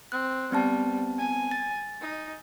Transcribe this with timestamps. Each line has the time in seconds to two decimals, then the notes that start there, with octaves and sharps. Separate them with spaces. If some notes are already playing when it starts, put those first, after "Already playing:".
0.12 C4 F#6
0.52 G3 B3 C4 A5
1.19 G#5
1.51 A6
2.01 D#4